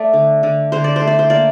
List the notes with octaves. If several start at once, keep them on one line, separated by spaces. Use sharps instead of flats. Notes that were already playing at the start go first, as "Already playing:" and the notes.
Already playing: A3 D5
D3
D3
D3 C5
D5
C5
A3
D5
C5
A#3 D5